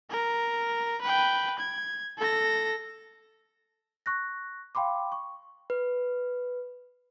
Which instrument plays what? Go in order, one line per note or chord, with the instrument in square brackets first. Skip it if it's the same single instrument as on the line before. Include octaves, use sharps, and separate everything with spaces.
[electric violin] A#4
B4 G5
G#6
A4 A#6
[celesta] C#6 F#6 A#6
F5 G5 B5 C6 D6
C#6
[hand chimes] B4